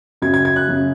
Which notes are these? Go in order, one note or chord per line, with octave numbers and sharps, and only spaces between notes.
F#2 C#3 F#3 G#6
G#6
G#6
F#6
F#2 C#3 F#3